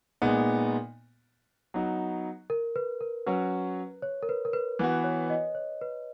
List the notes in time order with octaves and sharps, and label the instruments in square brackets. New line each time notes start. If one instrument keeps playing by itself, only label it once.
[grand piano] A#2 G#3 B3 D#4
F#3 B3 D#4 F#4
[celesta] A#4
B4
A#4
[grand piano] F#3 C#4 F#4 [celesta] B4
[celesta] C#5
A#4
B4
A#4
B4
[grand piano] E3 B3 F#4 [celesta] B4
[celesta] C#5
D#5
C#5
B4